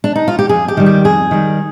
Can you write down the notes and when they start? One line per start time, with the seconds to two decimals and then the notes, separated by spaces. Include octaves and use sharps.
0.04 D4
0.16 D#4
0.28 F4
0.39 G4
0.49 F2 G#4
0.68 G4
0.77 D#3 G3
0.86 G4
1.05 F2 G#4
1.31 D#3 G3